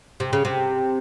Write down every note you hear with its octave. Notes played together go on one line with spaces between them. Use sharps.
C3
C#3
C3